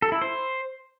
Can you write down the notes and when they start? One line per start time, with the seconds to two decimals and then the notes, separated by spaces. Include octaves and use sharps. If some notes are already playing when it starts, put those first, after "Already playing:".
0.02 A4
0.12 E4
0.22 C5